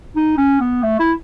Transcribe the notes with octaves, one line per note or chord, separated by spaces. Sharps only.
D#4
C#4
B3
A3
E4